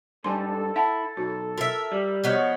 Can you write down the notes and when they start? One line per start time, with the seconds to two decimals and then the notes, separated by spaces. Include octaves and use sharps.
0.24 G#2 G3 A4 G#5 C6
0.76 E4 E5 F#5 A5
1.17 B1 F#4
1.58 F4 A#4 E5
1.92 G3
2.24 F3 B3 D#4 F#4 C#5